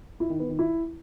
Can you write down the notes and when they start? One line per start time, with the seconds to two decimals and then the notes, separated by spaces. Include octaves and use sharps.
0.20 E4
0.30 D#3
0.39 B3
0.49 D#3
0.59 E4